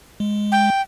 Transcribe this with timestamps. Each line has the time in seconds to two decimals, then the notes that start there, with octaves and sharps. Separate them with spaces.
0.20 G#3
0.52 G5